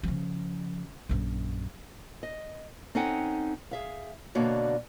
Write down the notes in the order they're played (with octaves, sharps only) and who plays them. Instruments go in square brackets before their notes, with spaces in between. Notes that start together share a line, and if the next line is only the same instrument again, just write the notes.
[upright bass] C#3 F3
A#1 F#2
[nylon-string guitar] D#5
C4 C#4 D#4 A4 F#5 G5
G#4 E5 F5
B2 D3 A#3 F#4 C#5 D5